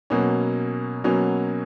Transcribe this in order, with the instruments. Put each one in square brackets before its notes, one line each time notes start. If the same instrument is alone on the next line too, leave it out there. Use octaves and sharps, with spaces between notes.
[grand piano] B2 F#3 A#3 C#4
B2 F#3 A#3 C#4